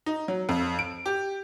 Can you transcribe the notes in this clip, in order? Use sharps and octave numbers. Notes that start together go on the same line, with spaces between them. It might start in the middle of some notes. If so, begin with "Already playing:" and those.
D#4
F#3
F2
D7
G4